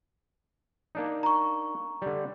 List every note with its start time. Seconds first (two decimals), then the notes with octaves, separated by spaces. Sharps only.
0.95 A#3 D4 D#4
1.23 A#5 C#6
2.02 D3 G3